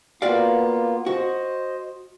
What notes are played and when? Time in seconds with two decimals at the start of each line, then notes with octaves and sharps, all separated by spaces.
0.22 A#3 B3 F4 F#4 D5 F5
1.06 F#4 C5 D#5